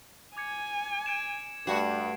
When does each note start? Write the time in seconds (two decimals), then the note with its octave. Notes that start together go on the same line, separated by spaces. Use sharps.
0.37 G#5 D6 G#6 C#7
1.06 G#6 D7 E7
1.67 G2 A3 F#4 C7